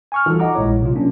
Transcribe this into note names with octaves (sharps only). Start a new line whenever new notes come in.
G#5 C#6 F6
E3 G3 D#4 F4 F#4 A4
D#5 F#5 A#5 D6
A#1 A#2 G#3 E4 C#5
C3 F#3 F4
A#3 C#4 D4